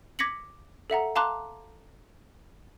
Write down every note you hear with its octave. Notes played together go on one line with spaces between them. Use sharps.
D6 G#6 A#6 B6 C#7 F#7
A4 E5 F#5 A#5
F5 A5 A#5 C6 D6 F#6